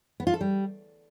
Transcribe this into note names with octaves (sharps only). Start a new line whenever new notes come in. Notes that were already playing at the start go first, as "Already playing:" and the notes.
B3
F4
A4
G3